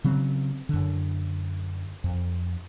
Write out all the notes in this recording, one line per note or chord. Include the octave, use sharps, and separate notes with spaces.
C#3 F#3 C4
F#2 D3
F2